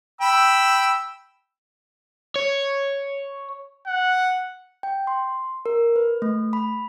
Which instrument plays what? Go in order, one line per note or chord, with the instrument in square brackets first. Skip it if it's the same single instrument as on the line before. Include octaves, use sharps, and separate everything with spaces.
[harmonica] G5 B5 E6
[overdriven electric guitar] C#5
[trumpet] F#5
[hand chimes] G5
C6
A#4
B4
A3
B5